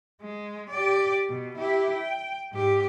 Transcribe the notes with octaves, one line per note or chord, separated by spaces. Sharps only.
G#3
G4 D5
B2
E4 G4
G5
G#2 G4